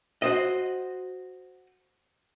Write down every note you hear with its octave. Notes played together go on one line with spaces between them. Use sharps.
F#4 C5 D#5